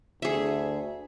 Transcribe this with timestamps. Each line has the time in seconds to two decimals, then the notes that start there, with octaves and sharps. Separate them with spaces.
0.22 D2 G#4 E5